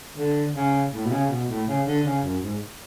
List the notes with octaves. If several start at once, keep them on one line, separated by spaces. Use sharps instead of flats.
D3
C#3
A2
B2
C#3
B2
A2
C#3
D3
C#3
F#2
G#2